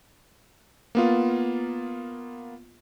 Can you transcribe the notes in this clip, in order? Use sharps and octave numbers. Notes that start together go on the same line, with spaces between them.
A#3 B3 F4